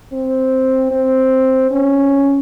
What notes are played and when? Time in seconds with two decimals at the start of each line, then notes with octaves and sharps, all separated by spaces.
0.12 C4
0.91 C4
1.71 C#4